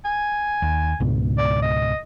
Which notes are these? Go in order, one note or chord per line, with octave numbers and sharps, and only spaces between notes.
G#5
D#2
C#2 G#2 B2
D5
D#5